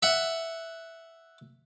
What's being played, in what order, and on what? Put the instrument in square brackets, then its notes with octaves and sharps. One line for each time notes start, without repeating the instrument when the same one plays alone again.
[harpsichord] E5 F#5